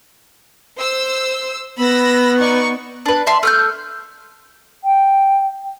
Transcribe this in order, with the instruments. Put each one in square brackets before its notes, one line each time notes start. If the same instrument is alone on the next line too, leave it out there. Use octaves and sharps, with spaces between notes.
[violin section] C5 E6
[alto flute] B3 [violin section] B5 E6 A#6
[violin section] D#4 D5 C#6
[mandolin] D4 B4
E5 A5 C6
A3 F6 G6
[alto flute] G5